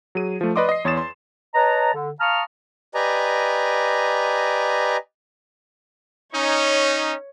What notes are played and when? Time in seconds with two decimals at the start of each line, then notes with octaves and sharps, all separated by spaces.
0.15 F#3 G#4 D#7
0.41 F3 A3
0.56 B4 D5 D#5 C6 D6
0.69 D#5 C7
0.85 E2 C#5 C6 D#6 A6 E7
0.97 C6
1.54 B4 C#5 D#5 A5 A#5
1.93 D3
2.20 F5 A5 A#5 C#6 D#6 F6
2.95 G4 B4 D5 D#5 G#5 A#5
6.34 C#4 D#4 C#5